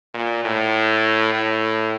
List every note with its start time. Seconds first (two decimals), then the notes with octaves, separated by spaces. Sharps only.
0.14 A#2
0.45 A2
1.34 A2